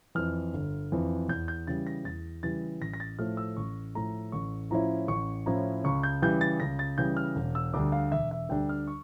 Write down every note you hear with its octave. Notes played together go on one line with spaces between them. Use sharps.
F2 E3 F6
G1
F2 E3
E2 G6
G6
C#3 E3 G3 A6
A#6
E2 A6
C#3 E3 G3 A6
A1 A#6
A#6
A6
A2 F3 A3 F6
E6
A1 C#6
A2 F3 A3 A#5
A1 C#6
A2 F3 C#4 E4 A#5
A1 C#6
A2 F3 C#4 E4 A#5
C#2 C#6
G6
C#3 E3 G3 G6
A6
C#2 A#6
A6
C#3 E3 G3 G6
F6
E1
E6
D2 D3 G3 D4 D6
F5
E1 E5
E5
D2 D3 G3 D4 G5
F6
C#6